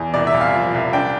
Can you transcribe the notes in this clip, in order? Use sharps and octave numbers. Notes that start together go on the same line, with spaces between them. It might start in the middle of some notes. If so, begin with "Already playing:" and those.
Already playing: E2
C2 D5
E5
C2
F5
F3
C2
D4 G5